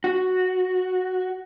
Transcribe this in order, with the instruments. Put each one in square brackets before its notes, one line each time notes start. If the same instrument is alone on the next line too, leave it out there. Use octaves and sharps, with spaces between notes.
[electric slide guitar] F#4